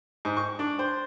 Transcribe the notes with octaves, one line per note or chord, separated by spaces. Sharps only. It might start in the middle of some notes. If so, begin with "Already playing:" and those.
G#2
C#6
D4
C5